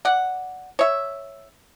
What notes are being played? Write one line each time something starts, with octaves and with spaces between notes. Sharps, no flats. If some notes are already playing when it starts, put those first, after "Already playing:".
D5 F#5
C#5 E5